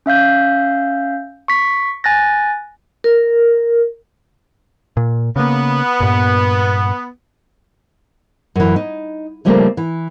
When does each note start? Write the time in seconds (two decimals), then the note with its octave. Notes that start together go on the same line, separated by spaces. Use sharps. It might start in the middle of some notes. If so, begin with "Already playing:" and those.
0.06 C#4 E5 F5 G6
1.48 C#6 B6
2.04 G#5 F#6 A6 A#6
3.04 A#4
4.97 A#2
5.36 C#3 A#3 B3
6.00 G2 A#2
8.55 F#2 E3
8.76 D#4
9.45 C#3 F3 G3 A3 A#3 C4
9.77 E3